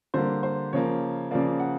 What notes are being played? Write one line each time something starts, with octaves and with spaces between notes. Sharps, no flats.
D3 G3 A#3 C5
C5
C#3 F3 A#3 C#5
C#3 F3 A#3 D5
F#5